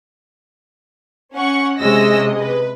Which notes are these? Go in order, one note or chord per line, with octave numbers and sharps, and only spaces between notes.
C#4 F#5 C#6
C3 G#3 C#4 D#5 E6 A#6
B4